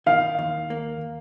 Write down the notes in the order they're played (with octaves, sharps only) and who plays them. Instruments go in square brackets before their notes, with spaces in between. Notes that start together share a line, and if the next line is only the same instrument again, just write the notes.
[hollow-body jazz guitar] D#3 [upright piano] F5
[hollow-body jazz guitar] D#2
A#3